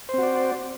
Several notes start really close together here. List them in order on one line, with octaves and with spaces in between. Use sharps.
C5 C4 F#4 D5